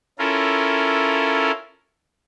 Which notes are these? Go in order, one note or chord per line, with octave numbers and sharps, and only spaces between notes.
C#4 E4 F4 A4 A#4